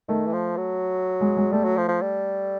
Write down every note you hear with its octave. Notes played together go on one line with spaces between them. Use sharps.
D#3 A3
E3
F3
F#3
G#3
G#3
G3 A3
F#3
F3
F3
G3